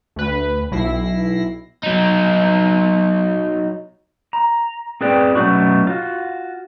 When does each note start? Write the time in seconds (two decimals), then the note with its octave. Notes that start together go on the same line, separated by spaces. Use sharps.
0.16 D2 B4
0.72 B1 E4 A#6 C7
1.83 F#3 D#4
4.33 A#5
5.01 C4 G#4 B4 D5 G5
5.35 B2 F#3 G#3 A3 C#4 F#4
5.87 F4 F#4